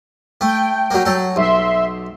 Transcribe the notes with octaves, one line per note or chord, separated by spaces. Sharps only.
A3 G5
F#3 A#3
F#3 A4
B1 E5 C6